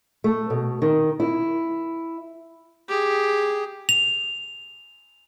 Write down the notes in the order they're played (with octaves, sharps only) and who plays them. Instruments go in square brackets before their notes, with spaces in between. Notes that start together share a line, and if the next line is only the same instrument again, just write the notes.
[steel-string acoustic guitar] A3
B2
D#3
E4
[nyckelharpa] G4 G#4
[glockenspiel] F7